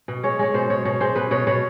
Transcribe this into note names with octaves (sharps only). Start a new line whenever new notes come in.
B2
G#3 C#5
G#3 C#5
B2 C5
B2 C#5
B2 C#5
G#3 C5
B2 B4
B2 C#5
B2 C#5